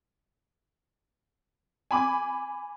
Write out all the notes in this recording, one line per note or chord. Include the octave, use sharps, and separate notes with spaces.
G#5 B5 D6